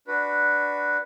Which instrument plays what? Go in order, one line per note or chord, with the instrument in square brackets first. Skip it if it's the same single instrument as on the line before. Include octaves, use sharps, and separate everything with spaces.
[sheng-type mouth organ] D4 F#4 B4